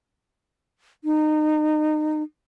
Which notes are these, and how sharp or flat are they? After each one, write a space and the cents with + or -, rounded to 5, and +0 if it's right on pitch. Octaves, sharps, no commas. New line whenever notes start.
D#4 -25